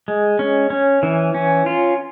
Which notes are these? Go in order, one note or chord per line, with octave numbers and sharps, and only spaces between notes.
G#3
C#4
C#4
E3
C#4
F4